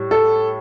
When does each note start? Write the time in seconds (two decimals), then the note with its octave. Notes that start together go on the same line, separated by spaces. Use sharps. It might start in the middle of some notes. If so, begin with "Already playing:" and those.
Already playing: A2 G3
0.11 A4